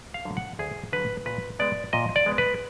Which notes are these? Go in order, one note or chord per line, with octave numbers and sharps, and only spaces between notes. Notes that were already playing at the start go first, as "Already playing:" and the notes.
F5
D3 F#3
F#5
D2 G#4
D3 F#3 B4
A#2 B4
G#3 B3 D5
A#2 D#5
D5
G#3 B3
B4